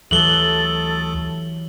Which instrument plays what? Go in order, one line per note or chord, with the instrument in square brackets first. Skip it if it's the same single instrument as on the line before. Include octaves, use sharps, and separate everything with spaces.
[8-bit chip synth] D2 [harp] E3 F#3 G4 [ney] A4 [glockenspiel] F#7 G7